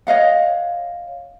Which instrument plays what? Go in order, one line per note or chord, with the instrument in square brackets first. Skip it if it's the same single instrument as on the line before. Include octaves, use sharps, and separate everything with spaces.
[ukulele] C#5 D#5 F5 F#5